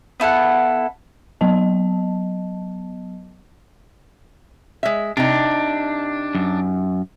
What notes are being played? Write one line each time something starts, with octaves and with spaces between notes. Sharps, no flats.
B3 E4 A4 F#5
F#3 B3 D#5 A5
G#3 E5
C3 D4 D#4
F#2